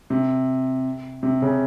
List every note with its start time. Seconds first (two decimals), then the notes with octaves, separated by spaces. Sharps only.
0.10 C3
1.23 C3
1.42 C#3